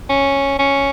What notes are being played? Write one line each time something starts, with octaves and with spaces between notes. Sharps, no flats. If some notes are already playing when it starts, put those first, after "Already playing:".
C#4
C#4